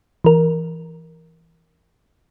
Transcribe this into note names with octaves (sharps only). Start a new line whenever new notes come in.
E3 A#4